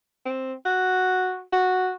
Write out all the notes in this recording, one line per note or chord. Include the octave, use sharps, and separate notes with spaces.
C4
F#4
F#4